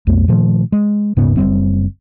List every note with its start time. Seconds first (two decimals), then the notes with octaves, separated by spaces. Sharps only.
0.07 B1 F2 A3 B3
0.28 A#2 D#3 F3 A3
0.72 G#3
1.17 D#1 G#2 C#3 B3
1.37 F#1 G2 G3 C4